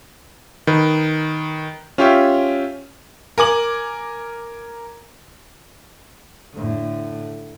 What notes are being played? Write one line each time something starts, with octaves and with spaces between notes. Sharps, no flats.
D#3 B4
C#4 F4 G4 C#5 E5 G5
A#4 G#5 D6 F#7
A2 D3